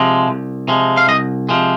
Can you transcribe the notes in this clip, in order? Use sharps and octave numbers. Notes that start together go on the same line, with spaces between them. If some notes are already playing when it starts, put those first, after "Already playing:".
Already playing: C3 F3 G#3
C2
C3 F3 G#3
F5
C2 D#5
C3 F3 G#3